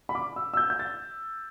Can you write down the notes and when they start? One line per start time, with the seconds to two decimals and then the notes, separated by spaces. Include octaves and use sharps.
0.09 B5
0.15 D6
0.36 E6
0.54 E6
0.57 G6
0.70 G6
0.79 A6